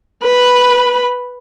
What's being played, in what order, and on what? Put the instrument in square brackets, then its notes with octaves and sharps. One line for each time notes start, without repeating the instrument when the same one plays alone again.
[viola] B4 B5